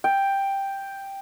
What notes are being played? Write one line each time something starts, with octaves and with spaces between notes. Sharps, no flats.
G5